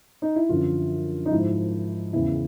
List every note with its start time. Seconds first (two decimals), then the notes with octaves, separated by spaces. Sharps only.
0.22 D#4
0.36 E4
0.49 F#2 D3 F3 F4
1.26 D#4
1.31 G#2 F3 E4
2.13 E2 C#3 E3 E4